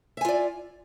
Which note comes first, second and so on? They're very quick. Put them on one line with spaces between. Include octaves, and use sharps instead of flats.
E5 G#5 F4 D5